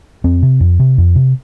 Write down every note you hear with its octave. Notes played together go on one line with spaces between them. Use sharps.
F2 C4
C3
F2
C3
F2
C3